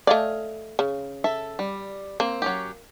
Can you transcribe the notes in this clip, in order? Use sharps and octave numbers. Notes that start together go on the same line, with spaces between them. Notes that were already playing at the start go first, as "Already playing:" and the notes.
A3 D5 D#5 F5 G#5
C#3
A4 E5
G3
A#3 C4
F#3 C#4 G4